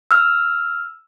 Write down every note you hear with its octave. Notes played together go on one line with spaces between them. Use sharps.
E6 F6